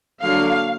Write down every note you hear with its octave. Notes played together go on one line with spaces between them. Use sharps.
D3 F#3 A#3 D4 F5